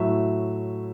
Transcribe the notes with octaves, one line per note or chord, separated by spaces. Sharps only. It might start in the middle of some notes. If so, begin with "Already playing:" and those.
Already playing: A2 F#3 A3 E5